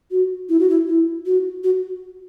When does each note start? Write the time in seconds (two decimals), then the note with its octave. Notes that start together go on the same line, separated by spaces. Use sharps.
0.11 F#4
0.49 E4
0.60 F#4
0.69 E4
0.88 E4
1.26 F#4
1.64 F#4